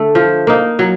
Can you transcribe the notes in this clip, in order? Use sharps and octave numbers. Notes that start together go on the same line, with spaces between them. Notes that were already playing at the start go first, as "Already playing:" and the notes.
Already playing: D3 A3
F3
A#3 D#4
F#3